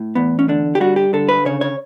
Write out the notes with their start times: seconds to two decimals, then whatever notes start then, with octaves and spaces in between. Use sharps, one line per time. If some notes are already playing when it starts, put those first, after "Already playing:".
Already playing: A2
0.15 E2 B3
0.39 C#4
0.48 D3 D4
0.75 G4
0.80 G3 F#4
0.96 G4
1.13 D3 A4
1.29 B4
1.45 C#3 C#5
1.61 C#5